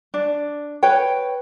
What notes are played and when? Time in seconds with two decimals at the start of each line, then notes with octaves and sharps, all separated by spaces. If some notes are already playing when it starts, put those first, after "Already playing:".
0.14 D4
0.83 B4 C#5 G5